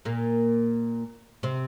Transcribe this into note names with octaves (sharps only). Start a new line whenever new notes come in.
A#2 A#3
C3 C4